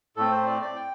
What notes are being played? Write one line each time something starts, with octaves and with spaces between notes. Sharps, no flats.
A2 A3 C4 A4
C5
D5
D5
G5